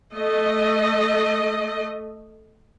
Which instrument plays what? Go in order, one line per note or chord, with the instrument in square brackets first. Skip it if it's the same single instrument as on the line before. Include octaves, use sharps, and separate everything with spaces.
[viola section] A3 D#5